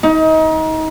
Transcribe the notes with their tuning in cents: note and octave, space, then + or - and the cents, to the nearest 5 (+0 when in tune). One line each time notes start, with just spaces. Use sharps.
D#4 +30